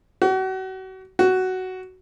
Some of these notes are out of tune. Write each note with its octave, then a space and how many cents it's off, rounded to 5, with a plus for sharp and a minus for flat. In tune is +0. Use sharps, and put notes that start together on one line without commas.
F#4 +35
F#4 +10